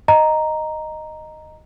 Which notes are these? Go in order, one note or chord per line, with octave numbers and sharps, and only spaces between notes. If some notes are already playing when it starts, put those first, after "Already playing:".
D#5 A#5